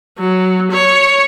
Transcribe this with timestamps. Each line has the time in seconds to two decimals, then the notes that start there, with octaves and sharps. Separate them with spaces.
0.18 F#3
0.71 C#5